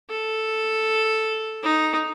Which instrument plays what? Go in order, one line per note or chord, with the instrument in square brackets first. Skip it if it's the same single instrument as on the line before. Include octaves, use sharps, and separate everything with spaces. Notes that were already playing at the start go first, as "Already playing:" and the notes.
[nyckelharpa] A4
D#4